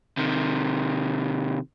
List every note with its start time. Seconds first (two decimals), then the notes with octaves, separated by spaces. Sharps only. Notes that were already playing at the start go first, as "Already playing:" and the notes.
0.17 C3 D#3